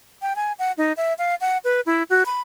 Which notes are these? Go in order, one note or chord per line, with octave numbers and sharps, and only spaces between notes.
G5
G#5
F#5
D#4
E5
F5
F#5
B4
E4
F#4
B5